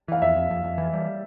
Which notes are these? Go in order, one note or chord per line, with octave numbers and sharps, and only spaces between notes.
E3 F5
F2 E5
F2
F2
F2
E3
G3